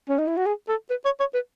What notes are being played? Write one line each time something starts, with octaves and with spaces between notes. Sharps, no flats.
C#4
D#4
E4
F#4
G#4
A4
B4
C#5
C#5
B4